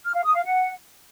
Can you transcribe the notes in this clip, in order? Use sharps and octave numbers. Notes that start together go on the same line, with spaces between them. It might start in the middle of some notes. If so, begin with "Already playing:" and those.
F6
F5
D#6
F5
F#5